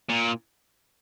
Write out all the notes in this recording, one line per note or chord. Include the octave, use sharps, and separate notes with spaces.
A#2